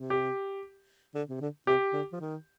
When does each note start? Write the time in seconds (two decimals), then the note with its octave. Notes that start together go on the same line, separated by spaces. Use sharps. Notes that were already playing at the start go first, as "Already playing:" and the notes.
Already playing: C3
0.10 G4
1.15 D3
1.29 C3
1.41 D3
1.67 C3 G4
1.93 D3
2.12 F3
2.20 D#3